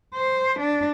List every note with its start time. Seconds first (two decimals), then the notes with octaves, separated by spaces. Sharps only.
0.14 C5
0.60 D4